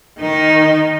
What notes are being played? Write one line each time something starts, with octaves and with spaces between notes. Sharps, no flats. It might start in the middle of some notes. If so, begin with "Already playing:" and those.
D#3 D#4